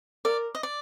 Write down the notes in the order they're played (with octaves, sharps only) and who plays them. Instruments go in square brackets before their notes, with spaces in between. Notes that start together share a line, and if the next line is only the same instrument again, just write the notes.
[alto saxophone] A#4 [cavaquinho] D5
[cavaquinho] D#5
D5